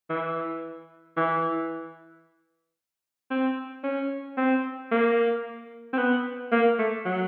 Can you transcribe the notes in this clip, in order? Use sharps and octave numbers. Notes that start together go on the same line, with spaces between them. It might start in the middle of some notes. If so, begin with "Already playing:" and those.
E3
E3
C4
C#4
C4
A#3
C4
B3
A#3
A3
F#3